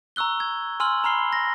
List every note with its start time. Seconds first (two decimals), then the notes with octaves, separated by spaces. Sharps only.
0.16 A#5 C#6 E6 F#6 G7
0.40 G#6
0.80 G#5 C6 E6 F6 F#7
1.04 A#5 B5 F6 C7 G7
1.33 A#6